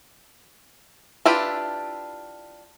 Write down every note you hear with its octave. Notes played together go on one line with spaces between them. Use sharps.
D4 E4 F4 G4 B4